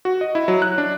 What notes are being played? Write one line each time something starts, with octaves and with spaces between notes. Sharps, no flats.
F#4
D#5
E4
F#3
F#6
D4